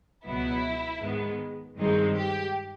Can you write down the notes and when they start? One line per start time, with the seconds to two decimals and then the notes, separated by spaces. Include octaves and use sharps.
0.25 C#2 B2 F#3 B3 E4
1.02 G#2 D#3 G#3 B3
1.78 G2 D#3 G#3 C4 D#4
2.16 G4